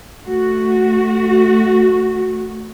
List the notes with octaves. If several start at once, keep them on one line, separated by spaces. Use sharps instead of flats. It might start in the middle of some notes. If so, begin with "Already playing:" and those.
A3 F#4